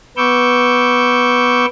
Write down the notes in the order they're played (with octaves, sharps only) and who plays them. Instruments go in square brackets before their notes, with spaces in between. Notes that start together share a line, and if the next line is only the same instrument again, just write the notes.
[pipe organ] B3 B4 C#6 D6 E6 G6